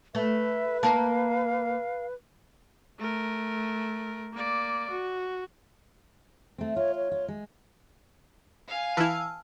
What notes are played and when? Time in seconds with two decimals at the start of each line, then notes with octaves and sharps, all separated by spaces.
0.15 A3 B4 E5
0.83 A#3 A#4 F5 A5
2.99 A3 A#4
4.33 A#3 D5
4.90 F#4
6.58 A3 C4
6.76 F4 C#5
6.96 C#5
7.11 F4
7.28 G#3
8.68 F5 G#5
8.97 E3 E4 A5 E6 F6